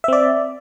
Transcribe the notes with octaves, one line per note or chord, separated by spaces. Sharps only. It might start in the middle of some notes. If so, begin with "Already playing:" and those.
C4 D5 E5